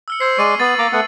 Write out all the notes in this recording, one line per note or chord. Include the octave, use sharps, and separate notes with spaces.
E6 F6 C#7
C5 E6 G#6 C7
G#3 D5 C#6 D#7
B3 A6 F#7
A#3 A#5 D6
A3 B3 F#5